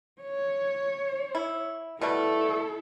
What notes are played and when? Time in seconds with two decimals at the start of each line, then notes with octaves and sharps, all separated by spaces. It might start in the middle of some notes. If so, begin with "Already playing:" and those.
0.22 C#5
1.35 E4
2.01 B2 G3 A3 E4 A4